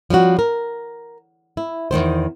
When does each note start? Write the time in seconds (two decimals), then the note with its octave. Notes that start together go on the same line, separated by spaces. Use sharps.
0.10 F3 G3 C#4 F#4
0.39 A#4
1.57 E4
1.91 E2 A2 D#3 C5